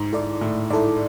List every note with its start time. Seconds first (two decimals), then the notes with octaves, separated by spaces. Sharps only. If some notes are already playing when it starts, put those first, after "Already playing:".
Already playing: G#2
0.12 G#2 E4 A4 D5
0.41 A2 A3
0.70 G#2 E4 A4 D5